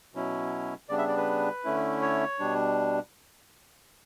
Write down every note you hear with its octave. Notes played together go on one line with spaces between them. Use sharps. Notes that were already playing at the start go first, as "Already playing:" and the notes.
B2 F#3 C#4 E4
C#3 G3 B3 D4 D5
E5
D5
B4
D3 A3 C#4 E4
C#5
B2 G3 D4